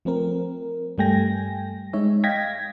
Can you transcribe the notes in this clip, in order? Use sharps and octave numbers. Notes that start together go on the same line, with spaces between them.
F3 A3 C4 A#4
G2 G3 A3 G5 G#5 A#6
G#3 D#4 C#5 E5
D#5 F5 G5 G#6 A#6 B6